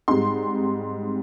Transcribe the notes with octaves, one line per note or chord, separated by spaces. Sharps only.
G#2 G3 C4 D#4 C6